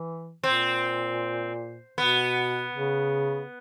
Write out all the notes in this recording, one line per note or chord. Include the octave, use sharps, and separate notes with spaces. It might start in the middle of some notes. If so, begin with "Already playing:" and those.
Already playing: E3
A#2 C4
B2 B3
C#3